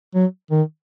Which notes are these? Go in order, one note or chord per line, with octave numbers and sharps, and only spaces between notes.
F#3
D#3